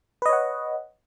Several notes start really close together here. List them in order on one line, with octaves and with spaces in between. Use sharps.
B4 D#5 C#5 F#5